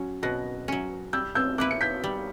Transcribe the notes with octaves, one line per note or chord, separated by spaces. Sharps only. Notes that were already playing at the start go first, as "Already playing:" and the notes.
Already playing: F#3 C#4
B2 F#6 A#6
F#3 C#4
G3 E6 G6
E6 G6
A#3 E4 B4 D6 F#6
C#7
G6 B6
G3